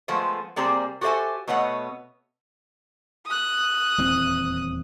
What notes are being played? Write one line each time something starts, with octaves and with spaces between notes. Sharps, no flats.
F3 G#3 A3 B3 C5
C3 G3 A#3 C4 G#4 C5
F#4 G4 A4 C5 E5 G#5
B2 A3 B3 C#5 D#5 F#5
D#6 F#6
D#1 E2 C4